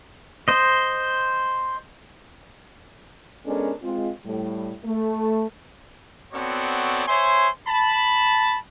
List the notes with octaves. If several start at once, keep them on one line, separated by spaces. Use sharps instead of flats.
C5 D#5
G#3 B3 C#4 D4 A4 A#4
G#3 C4 F4
A2 G3
A3
B3 C4 F#4 A4 C#5 D5
C5 C#5 E5 G#5 C6
A5 B5